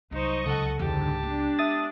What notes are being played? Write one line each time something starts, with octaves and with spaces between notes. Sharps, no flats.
C2 F#3 D#4 C5 D#5 C#6
C#2 A4 F#5
E2 G#2 D3 G4 A5
G#3 B3 D4
E5 D#6 A6